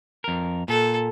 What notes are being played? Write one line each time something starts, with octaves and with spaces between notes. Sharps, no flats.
F2 A#4
A#2 A4